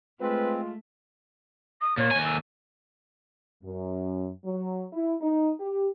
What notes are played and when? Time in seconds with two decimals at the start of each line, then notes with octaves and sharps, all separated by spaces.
0.21 G#3 A3 C4 F4 B4
1.81 D#6
1.97 A#2 C#5
2.11 D#2 G#5
2.24 E6
3.64 F#2
4.45 F#3
4.93 E4
5.22 D#4
5.60 G4